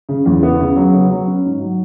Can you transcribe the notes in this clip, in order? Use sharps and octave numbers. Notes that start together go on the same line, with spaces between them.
C#3
E2
B3
C#3
F#3
B3
F#3
C#4
G#2
F#3